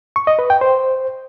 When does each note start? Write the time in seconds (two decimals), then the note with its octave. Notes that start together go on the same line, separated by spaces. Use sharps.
0.16 C#6
0.27 D#5
0.39 B4
0.50 G5
0.61 C5